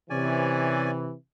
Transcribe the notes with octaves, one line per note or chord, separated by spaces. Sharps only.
C3 E3 C#4 D5 G#5